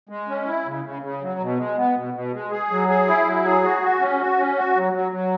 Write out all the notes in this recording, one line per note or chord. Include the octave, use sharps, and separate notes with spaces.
G#3
C#4
E4
C#3
C#3
C#3
F#3
B2
G#3
B3
B2
B2
G#3
G#4
F#3
G#4
E4
F#3
G#4
F#4
F#4
C#4
F#4
C#4
F#4
F#3
F#3
F#3